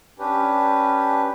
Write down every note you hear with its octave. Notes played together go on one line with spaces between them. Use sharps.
C#4 D4 G4 B4